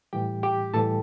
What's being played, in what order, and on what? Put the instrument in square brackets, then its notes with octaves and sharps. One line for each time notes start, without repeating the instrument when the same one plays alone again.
[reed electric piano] A2 E3 G3 G4 G5
G4 G5
A2 E3 G3 A4 A5